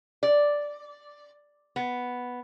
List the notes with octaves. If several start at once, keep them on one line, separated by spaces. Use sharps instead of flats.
D5
B3